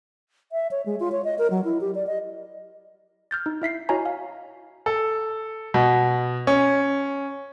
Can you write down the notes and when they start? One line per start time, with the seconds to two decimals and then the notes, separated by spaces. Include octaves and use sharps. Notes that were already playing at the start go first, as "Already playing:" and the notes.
0.52 E5
0.71 C#5
0.86 G#3
1.00 F4
1.12 C#5
1.24 D#5
1.39 A#4
1.50 F#3
1.64 E4
1.81 G4
1.95 D5
2.07 D#5
3.31 F6 G6 A6
3.46 D#4
3.62 E4 E5 B6 C7
3.89 E4 F#4 C#5 D#5 G#5 A#5
4.05 F5
4.86 A4
5.74 B2
6.47 C#4